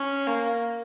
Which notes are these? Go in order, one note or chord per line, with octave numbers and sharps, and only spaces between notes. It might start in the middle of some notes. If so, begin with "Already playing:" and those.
Already playing: C#4
A#3